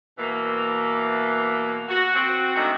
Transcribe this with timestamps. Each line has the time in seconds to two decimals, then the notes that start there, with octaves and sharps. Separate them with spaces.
0.18 B2 E3 A#3
1.89 F#4
2.15 C4 F#4
2.56 G#2 D#3 G#3 A3 D4 F#4